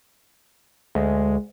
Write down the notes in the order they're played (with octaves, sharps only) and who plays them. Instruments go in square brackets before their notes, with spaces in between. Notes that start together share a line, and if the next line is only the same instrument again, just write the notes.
[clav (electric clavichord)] D2 [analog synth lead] G#3